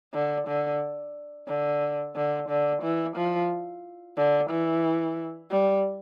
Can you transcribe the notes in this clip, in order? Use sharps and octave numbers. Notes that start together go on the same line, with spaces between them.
D3
D3
D3
D3
D3
E3
F3
D3
E3
G3